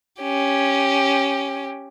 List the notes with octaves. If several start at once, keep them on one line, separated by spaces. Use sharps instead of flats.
C#4 G4